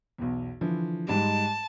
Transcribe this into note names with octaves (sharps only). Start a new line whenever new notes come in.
B1 E2
D3 E3 F3
G#2 G3 G#3 A5